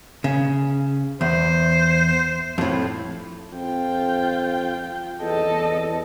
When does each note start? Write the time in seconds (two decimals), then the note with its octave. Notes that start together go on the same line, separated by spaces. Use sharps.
0.24 C#3
1.21 E2 C5
2.58 F2 A2
3.53 F2 F4 G5
5.22 E2 A4 D#5